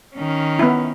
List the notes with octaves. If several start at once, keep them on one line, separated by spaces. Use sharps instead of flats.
D#3 C#4
B3 E4